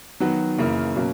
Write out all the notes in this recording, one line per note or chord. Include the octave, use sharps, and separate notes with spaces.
D#3 F#3 B3 F#4
F#2 C#3 E3 A#3 C#4
B2 F#3 A#3 C#4